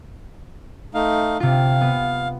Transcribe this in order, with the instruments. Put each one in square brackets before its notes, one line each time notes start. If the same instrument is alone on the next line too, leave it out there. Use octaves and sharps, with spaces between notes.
[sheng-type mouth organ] A3 D#4 F5
[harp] C3 F4 [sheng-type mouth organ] F5
[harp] B3